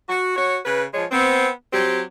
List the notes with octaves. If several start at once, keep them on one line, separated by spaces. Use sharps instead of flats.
F#4
F#4 C#5
C#3 B4
F3 G#3 C#5
B3 C4
F#3 C4 G4